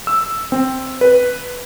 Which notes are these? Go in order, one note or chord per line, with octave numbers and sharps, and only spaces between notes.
E6
C4
B4